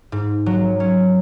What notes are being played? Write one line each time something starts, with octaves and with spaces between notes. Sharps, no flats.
G#2
F#3
C#4